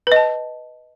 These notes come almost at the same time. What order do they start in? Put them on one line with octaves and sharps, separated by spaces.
B4 D#5 A5